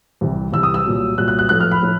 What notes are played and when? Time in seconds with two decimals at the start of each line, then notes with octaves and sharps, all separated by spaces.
0.21 C2 C3 E3
0.53 C2 C3 E3 E6
0.63 D#6
0.74 E6
0.85 C2 A#2 F#3
1.17 C2 A#2 F#3 F#6
1.28 F#6
1.39 F#6
1.49 A2 F3 A3 F#6
1.61 F6
1.72 B5
1.82 A2 F3 A3